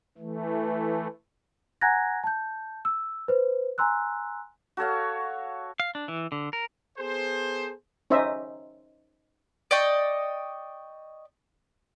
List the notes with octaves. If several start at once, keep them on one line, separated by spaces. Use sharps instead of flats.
E3 A3
F#5 G#5 A#5 F#6 G#6 A#6
A5 G6
E6
B4 C5
G#5 A#5 C6 E6 F#6
F#4 A4 C#5 F5
F5
D4
E3
D3
A#4
B3 G#4 A4 C5
C#4 D#4 C5 D#5 E5
D5 D#5 G5 C#6